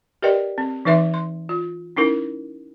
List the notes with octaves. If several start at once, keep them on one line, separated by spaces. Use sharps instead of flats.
G4 A#4 B4 D5 D#5 G5
C4
E3 D#4 B4 E5 C6 D6
C6
F4
C#4 D#4 E4 A#4